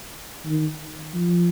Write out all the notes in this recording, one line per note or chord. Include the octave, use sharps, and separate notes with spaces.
D#3
F3